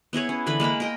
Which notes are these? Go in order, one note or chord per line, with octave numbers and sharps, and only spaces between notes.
B3 E4 G#4 C#5
C#4
D3 E3 B4 B5
G#3 A#3 A#5 B5
A#4 D#5 G5